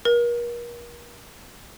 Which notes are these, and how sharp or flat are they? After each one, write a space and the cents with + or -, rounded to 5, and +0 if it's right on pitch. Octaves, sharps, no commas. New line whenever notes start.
A#4 +40